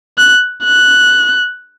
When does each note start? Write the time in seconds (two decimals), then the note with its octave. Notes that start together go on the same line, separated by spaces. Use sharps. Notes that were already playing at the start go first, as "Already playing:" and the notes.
0.18 F#6
0.64 F#6